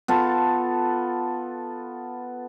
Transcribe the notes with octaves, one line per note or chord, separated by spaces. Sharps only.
B3 F4 A4